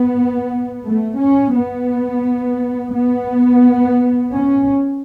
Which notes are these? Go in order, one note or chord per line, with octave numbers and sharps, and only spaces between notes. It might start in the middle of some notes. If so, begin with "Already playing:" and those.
Already playing: B3
A3
C#4
B3
B3
C#4